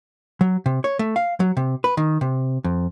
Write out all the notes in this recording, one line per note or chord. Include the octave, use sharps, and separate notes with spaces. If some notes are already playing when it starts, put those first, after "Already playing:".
F#3
C3
C#5
A3
F5
F#3
C3
B4
D#3
C3
F2